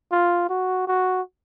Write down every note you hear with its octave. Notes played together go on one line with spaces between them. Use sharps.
F4
F#4
F#4